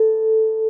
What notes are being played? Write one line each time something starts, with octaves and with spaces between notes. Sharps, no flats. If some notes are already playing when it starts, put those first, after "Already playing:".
Already playing: A4